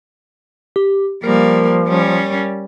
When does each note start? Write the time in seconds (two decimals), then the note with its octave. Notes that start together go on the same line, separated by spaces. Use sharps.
0.76 G4
1.24 F3 G3 A#3 A#4
1.88 G3 C#4